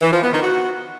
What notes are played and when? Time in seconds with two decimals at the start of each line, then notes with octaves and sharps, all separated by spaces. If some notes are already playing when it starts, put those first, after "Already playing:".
0.02 E3
0.12 F3
0.22 B3
0.33 D#3
0.43 F#4